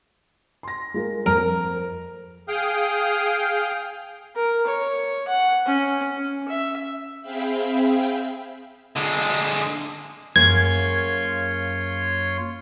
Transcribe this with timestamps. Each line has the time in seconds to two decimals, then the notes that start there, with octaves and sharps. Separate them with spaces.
0.63 C6 A#6
0.94 G#3 F4 A#4
1.26 F2 A#4
2.48 G#4 F5 G5 D#6 F6 G6
4.36 A#4
4.67 C#5
5.28 F#5
5.66 C#4
6.17 C#4
6.48 E5
7.21 C4 G#4 E5 F5 G5 B5
8.96 D3 G#3
10.36 F#2 A#3 F4 G#4 C#5 C6 G#6